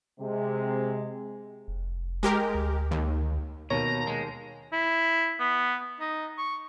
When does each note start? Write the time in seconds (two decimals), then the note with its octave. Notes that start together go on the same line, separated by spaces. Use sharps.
0.20 C3 G#3
1.68 F1
2.23 G#3 G4 A#4
2.54 D2
2.91 D#2
3.70 D#2 B2 D#3 C#5 A#5
4.07 G#3
4.73 E4
5.40 B3
6.00 D#4
6.38 C#6